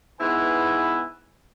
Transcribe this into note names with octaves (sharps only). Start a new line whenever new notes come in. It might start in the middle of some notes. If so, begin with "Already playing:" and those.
G#2 B3 E4 B4 G#5